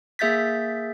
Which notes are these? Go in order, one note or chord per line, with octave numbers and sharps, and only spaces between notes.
A#3 G#4 E5 G6 A6 B6